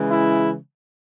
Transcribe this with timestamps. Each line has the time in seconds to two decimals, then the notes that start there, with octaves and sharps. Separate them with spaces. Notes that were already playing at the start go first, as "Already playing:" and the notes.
Already playing: C#3 E3 G#3
0.11 E4